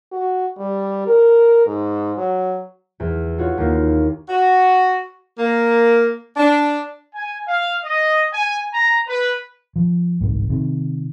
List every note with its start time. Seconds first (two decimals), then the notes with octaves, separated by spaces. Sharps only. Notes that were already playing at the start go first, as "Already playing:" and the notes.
0.12 F#4
0.58 G3
1.07 A#4
1.67 G#2
2.18 F#3
3.00 E2
3.38 F4 F#4 C#5
3.58 D#2 F4
4.29 F#4
5.39 A#3
6.37 D4
7.14 G#5
7.47 F5
7.84 D#5
8.32 G#5
8.74 A#5
9.07 B4
9.76 F3
10.21 G1 C2 G#2
10.50 C3 D#3